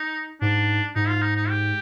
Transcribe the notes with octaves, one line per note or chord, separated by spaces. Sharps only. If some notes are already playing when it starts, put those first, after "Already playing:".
Already playing: D#4
G#2 D4
G#2 D#4
F4
D#4
D#4
G4